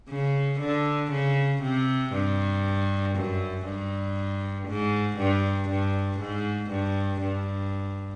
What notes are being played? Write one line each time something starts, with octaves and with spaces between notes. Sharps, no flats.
C#3
D3
C#3
C3
G2
F#2
G2
G#2
G2
G2
G#2
G2
G2